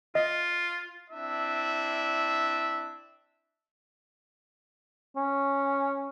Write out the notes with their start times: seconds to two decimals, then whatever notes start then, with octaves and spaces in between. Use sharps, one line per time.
0.15 F4 D#5
1.10 C4 D4 E4 E5
5.16 C#4